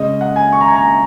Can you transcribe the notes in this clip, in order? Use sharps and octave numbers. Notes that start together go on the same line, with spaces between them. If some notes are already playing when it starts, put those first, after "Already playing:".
Already playing: C#3 G#3 C#4 D#5
F#5
G#5
C#6
A#5
G#5
A#5